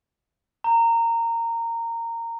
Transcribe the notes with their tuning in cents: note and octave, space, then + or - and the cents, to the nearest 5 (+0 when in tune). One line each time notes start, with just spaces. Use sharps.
A#5 -15